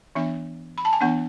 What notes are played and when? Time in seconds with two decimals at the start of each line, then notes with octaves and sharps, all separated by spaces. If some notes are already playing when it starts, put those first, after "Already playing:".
0.15 E3 B3 D4 E5
0.78 B5
0.85 A5
0.93 G#5
1.01 E3 B3 D4 F#5